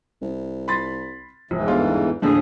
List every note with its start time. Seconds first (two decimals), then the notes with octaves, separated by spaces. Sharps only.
0.22 C2
0.68 B5 C6 A6
1.51 F1 E2 G#2 E3
1.68 G1 F4
2.22 A#1 D#2 A2 D3 F3 G#4